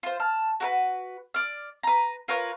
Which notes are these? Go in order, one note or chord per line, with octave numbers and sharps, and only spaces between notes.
F4 C5
A5 F6
F#4 A#4 B4
D5 F6
B4 A#5
F4 A#4 B4 C#5